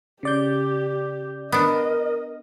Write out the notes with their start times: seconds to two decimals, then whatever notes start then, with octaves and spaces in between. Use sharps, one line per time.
0.23 C#3 G4 D5 G6
1.52 B3 D4 A#4 D#5